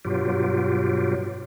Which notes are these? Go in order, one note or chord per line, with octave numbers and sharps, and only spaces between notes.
G2 B2 F#3 F4 G4